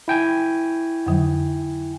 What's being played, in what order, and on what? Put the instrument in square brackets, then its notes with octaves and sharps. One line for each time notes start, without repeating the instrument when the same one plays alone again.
[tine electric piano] E4 G5 G#5
[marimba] F2 D3 F#3